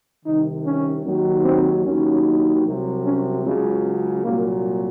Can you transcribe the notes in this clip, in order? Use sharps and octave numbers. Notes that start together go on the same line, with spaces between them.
C2 C3 D#3 D#4
C#4
D#2 D#3 F#3
C4
D#2 D#3 F#3 C#4
C2 C3 F#3
C#4
C#2 C#3 F#3 C#4
C2 A#2 F#3 A#3